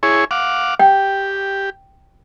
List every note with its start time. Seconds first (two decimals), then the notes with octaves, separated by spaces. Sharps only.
0.03 E4 G#4 C#5
0.31 F5 F#5 D6
0.79 G4 G5